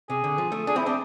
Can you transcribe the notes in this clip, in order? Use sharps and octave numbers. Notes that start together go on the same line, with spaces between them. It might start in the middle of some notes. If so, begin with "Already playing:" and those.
C3 G#4
D3
F3
A3
D4 G#4
C4 E4
C4 D4